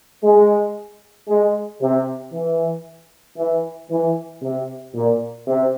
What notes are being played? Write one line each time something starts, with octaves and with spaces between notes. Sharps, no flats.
G#3
G#3
C3
E3
E3
E3
C3
A#2
C3